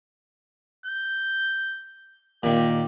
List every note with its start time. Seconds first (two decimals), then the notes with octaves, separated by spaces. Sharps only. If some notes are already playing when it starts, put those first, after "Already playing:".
0.86 G6
2.43 A#2 D#3 G4